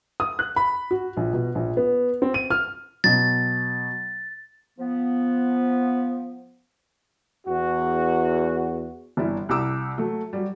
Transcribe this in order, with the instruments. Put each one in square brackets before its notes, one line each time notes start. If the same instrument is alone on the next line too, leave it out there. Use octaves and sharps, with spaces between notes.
[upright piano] D#6
F#6
B5
F#4
A#1
B2
A#1
B3
C4
D#7
F6
[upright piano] B2 F#3 [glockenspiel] A6
[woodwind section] F3 B3
[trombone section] E2 F#4
[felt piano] G1 E3 G3 E4
C2 E4 G4 A#5 D6 E6
F#3 A3
F#3 G3